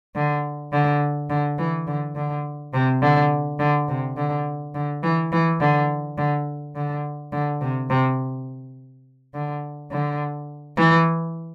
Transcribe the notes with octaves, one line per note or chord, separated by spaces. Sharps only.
D3
D3
D3
E3
D3
D3
C3
D3
D3
C3
D3
D3
E3
E3
D3
D3
D3
D3
C3
C3
D3
D3
E3